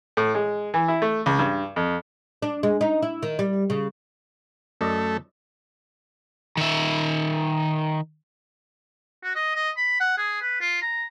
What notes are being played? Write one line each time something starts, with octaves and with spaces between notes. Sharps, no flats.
A2
G#3
E3
E4
A3
C#2
G2
F2
D4
G#3
D#4
E4
D#3
G3
C#3
F#2 A3 D5 D#5
D#3 E5
F#4
D#5
D#5
B5
F#5
G#4
B4
F4
A#5